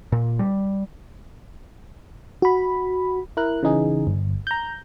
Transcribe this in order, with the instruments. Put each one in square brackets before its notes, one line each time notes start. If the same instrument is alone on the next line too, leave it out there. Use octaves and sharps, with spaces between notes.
[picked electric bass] A#2
G3
[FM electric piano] F#4 B5
E4 A#4 F#6
C#3 E3 D#4 G#4
G1
A#5 G6